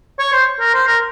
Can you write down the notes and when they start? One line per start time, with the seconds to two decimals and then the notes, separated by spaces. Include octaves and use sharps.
0.19 C#5
0.32 C5
0.60 A#4
0.73 C5
0.87 A#4